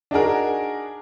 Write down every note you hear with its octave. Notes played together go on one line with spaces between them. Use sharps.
D4 D#4 F#4 G#4 A#4